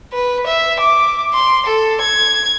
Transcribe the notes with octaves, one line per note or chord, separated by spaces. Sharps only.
B4
E5
D6
C6
A4
G#6